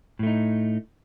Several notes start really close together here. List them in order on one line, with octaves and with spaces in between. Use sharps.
A2 A3 D#4